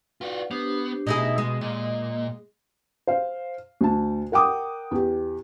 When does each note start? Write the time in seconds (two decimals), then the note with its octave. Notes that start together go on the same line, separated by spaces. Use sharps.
0.21 F4 F#4 B4 D5 F#5
0.51 B3 D4 G4 C5
1.07 B2 D#4 E4 G#4
1.38 G#3
1.61 A#2 A#3 D#5
3.07 C5 F5
3.81 D2 A5
4.32 A#4 F#5 G5 D6 D#6
4.91 E2 G4